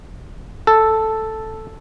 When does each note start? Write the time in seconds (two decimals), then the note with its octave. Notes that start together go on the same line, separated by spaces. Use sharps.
0.67 A4